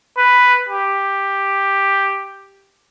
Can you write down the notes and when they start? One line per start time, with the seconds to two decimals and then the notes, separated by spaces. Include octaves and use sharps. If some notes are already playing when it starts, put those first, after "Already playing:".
0.18 B4
0.69 G4